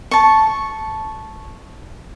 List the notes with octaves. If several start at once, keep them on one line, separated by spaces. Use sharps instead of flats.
A5 C#6